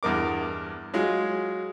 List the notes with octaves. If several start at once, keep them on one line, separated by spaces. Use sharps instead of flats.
E2 G2 A#4 D6
F#3 G#3 F4